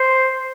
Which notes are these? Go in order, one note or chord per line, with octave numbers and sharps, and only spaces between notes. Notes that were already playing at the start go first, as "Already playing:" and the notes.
Already playing: C5